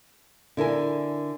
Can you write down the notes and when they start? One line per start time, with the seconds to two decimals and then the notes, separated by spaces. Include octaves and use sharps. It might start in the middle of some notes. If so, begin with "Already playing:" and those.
0.57 D3 E4 A#4 G#5